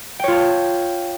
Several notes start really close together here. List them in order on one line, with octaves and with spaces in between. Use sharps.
G5 C#5 F4 A5